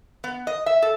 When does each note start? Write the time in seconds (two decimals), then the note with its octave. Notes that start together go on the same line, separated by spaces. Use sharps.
0.24 B3
0.47 D#5
0.66 E5
0.82 A4